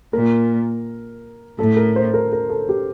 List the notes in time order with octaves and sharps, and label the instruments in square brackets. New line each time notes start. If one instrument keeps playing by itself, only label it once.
[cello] A#2 [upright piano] A#4
[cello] A2 [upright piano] A4
[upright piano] A#4
C5
A#4
A#4
A4
G4